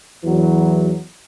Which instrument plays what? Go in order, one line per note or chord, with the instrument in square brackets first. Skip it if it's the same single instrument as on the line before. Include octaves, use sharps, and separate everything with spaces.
[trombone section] E2 E3 F#3